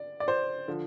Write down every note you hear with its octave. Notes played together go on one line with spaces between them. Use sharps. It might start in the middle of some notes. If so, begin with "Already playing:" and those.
Already playing: D5
D5
C5
D3 F3